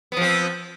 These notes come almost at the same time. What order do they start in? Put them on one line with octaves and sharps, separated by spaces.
B3 F3 C4